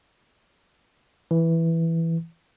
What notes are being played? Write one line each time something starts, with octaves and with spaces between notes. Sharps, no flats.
E3